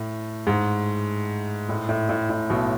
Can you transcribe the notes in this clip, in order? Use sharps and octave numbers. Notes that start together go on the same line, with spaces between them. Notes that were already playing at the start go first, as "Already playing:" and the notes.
Already playing: A2
G#2
A2
A2
A2
A2
B1 B2